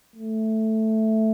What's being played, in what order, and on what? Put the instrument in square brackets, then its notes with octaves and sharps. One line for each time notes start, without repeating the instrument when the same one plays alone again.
[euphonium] A3